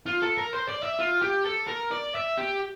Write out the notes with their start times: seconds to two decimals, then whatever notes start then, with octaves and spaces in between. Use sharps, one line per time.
0.06 F4
0.22 A4
0.38 A#4
0.53 C5
0.68 D5
0.83 E5
0.99 F4
1.22 G4
1.45 A4
1.68 A#4
1.91 D5
2.15 E5
2.37 G4